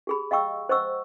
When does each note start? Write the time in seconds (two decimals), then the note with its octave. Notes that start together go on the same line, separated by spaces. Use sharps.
0.07 G4 G#4 B5
0.31 D#5 F5 G5 C#6 E6
0.69 C5 D#5 F#5 C#6 E6